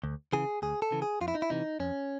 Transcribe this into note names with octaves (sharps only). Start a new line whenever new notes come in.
D2
C#3 E3 G#4
D2 G#4
A4
C#3 E3
G#4
F2 F4
E4
D#4
E4
C3 E3 D#4
F2 C#4